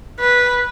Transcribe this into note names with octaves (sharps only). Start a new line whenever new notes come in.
B4